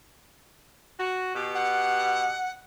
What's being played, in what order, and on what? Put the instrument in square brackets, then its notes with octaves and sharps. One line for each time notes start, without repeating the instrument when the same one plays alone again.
[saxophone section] F#4
B2 G4
[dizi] F#5